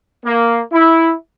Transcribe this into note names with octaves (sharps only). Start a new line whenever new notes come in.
A#3
E4